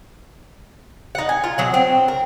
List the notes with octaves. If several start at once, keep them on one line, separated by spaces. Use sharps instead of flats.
D#4 F#5
G#5
F4
B2 F#3 F#5
C4
A#4